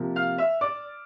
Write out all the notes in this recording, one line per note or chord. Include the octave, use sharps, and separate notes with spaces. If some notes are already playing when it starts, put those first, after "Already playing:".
Already playing: C3 F3 A#3
F5 F6
E5 E6
D5 D6